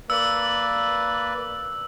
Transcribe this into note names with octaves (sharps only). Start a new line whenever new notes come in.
A#3 B4 D5 E6